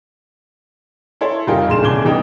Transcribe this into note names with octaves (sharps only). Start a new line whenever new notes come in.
E4 A4 C#5 C6
F1 G3 D#4 F4 A#4 G5
E1 A#1 C6 E7
D#1 C2 C#3 D6 G#6 G7
E3 G3 B3 D#4 G5